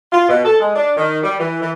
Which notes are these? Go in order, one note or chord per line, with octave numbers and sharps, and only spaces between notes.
F4
B2
A4
G#3
D4
D#3
G3
E3
E3